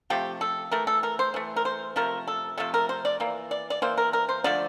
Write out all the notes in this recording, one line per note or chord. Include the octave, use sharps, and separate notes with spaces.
C3 F3 A3 G4
A4
E3 A3 A#4
A4
A#4
C5
E3 A3
A#4
C5
C3 F3 A3 A#4
A4
C3 F3 A3 A4
A#4
C5
D5
E3 A#3
D5
D5
E3 A#3 C5
A#4
A#4
C5
D3 F3 A3 D5